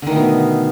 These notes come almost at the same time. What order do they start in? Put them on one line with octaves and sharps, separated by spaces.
D3 D#3 A3 B2